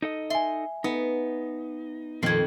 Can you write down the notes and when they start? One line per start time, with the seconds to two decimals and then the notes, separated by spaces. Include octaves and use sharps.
0.02 D#4 A4 D#5
0.30 E5 G#5 C6
0.84 B3 D#4
2.23 F2 A#2 D#3 F3 C4 G#6 C7